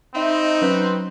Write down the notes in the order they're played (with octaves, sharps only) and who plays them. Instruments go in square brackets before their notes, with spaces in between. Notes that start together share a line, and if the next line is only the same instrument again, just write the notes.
[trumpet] C4 [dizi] D#4 [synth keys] D#5 E5 B5
[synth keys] F#3 C#4 [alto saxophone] B4